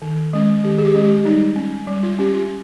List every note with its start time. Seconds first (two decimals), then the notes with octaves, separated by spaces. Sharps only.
0.02 D#3
0.33 G#3 C#4
0.64 D#3 G4
0.78 G#4
0.85 G4
0.95 G#3 C#4
1.05 G4
1.25 G3 D#4
1.56 C#4
1.87 G3
2.03 F4
2.19 C#4 G4
2.34 F4